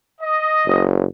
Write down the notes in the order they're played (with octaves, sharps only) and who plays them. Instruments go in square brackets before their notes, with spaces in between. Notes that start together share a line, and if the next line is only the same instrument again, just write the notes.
[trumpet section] D#5
[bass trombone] F#1